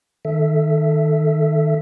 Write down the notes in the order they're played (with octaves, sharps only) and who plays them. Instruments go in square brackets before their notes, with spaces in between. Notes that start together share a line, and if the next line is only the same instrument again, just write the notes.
[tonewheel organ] D#3 A4 E5